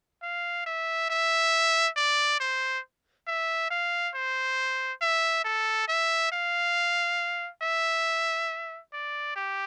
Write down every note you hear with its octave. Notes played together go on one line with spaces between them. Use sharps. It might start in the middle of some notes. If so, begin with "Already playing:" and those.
F5
E5
E5
D5
C5
E5
F5
C5
E5
A4
E5
F5
E5
D5
G4